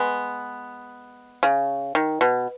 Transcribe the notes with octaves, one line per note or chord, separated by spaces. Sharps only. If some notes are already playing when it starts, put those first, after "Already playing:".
Already playing: G#3 B3
C#3
D#3
B2